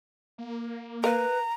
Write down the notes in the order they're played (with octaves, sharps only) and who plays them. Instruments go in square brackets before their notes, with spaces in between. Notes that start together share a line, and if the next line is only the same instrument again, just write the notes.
[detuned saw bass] A#3
[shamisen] A#4 F5 [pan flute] B4 [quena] A#5